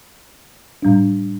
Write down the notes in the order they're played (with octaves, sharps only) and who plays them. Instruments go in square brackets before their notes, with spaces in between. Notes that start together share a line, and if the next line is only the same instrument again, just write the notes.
[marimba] A2 G3 D4